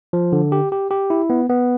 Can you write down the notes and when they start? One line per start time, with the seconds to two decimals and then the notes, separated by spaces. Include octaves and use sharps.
0.13 F3
0.33 D3
0.52 G4
0.72 G4
0.91 G4
1.10 E4
1.30 B3
1.49 B3